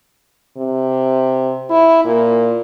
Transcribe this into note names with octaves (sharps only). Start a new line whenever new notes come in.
C3
E4
A#2